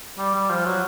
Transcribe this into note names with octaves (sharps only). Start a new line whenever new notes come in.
G3
G3
F3
F#3